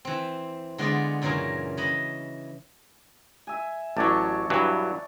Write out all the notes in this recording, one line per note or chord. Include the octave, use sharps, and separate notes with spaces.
E3 C4
D3 G#3 B3 F4 G#4 D5
F#2 A#2 C#3 E3 G#4 A#4
E3 D#5 B5
E5 G#5
A1 F#3 C#5 D5 A5
G2 E3 F#3